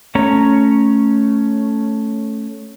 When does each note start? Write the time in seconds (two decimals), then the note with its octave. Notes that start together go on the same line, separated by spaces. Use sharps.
0.15 A3 C#4 C#5 A#5